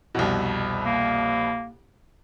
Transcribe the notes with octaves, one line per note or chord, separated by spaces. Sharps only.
C2 F2 B2
A#3